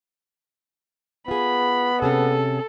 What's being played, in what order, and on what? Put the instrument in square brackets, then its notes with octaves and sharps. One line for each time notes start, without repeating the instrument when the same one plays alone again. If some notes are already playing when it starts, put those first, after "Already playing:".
[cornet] B3 [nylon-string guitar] F4 G#4 [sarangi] B5
[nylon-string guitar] C3 C#4 G#4 [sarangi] A4